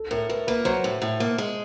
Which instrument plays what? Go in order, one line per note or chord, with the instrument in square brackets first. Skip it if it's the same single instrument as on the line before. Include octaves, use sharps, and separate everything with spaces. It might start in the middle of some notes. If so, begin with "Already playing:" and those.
Already playing: [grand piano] A4
[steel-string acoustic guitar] A2 [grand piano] A#4
[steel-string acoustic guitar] A2 [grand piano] B4
[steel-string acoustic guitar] A#3 [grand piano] B4
[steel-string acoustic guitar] F#3 [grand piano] C5
[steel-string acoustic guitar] A2
A2
A#3
G#3